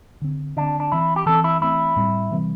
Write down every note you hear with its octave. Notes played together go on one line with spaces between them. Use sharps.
D3 C4
D3 C4 D4
D4
E3 C4 E4
G4
E3 C4 A4
E4
E3 A3 C4 E4
A2 G3 C4
C3 E3 G3 C4